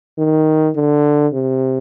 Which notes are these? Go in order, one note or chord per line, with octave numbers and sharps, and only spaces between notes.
D#3
D3
C3